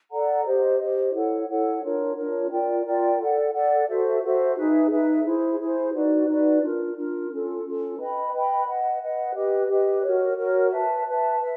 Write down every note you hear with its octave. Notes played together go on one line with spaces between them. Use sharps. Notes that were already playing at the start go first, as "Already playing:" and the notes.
A4 D5 F#5 A#5
G4 C5 D#5
G4 C5 D#5
E4 A4 C#5 F#5
E4 A4 C#5 F#5
D4 F4 A#4 C#5
D4 F4 A#4 C#5
F4 A#4 D5 G5
F4 A#4 D5 G5
A4 D5 F#5
A4 D5 F#5
F#4 A4 C5 E5
F#4 A4 C5 E5
D#4 G#4 B4 E5
D#4 G#4 B4 E5
E4 G#4 C5
E4 G#4 C5
D#4 F#4 B4 D5
D#4 F#4 B4 D5
D4 F4 A#4
D4 F4 A#4
C#4 F4 A4
C#4 F4 A4
B4 D#5 G5 B5
B4 D#5 G5 B5
B4 D#5 F#5
B4 D#5 F#5
G4 B4 D#5
G4 B4 D#5
F#4 A#4 C#5
F#4 A#4 C#5
B4 E5 A5
B4 E5 A5
B4 E5